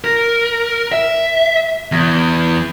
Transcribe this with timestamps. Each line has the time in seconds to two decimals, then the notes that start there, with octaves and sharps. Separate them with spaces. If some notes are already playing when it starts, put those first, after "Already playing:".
0.04 A#4
0.92 E5
1.92 E2